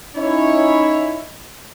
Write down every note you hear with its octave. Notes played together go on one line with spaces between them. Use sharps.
C#4 D#4 E4 C#5